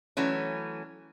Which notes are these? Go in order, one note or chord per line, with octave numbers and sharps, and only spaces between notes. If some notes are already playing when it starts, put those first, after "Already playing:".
E3 F#3 A3 C#4